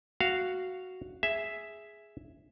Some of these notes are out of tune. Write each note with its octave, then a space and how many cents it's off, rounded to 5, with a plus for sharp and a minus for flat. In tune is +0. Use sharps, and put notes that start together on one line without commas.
F#4 +0 F5 -10
G#4 +0 E5 +0